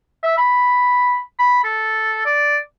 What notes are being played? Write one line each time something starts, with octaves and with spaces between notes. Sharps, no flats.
E5
B5
B5
A4
D5